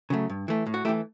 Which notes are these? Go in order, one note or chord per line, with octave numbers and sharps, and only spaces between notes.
C#3 F#3 A3
G2
E3 A3
A2
F#4
E3 A3 E4 G4